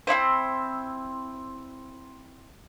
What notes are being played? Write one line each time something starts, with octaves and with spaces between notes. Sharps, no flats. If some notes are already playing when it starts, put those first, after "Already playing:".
C4 D#4 E4 C5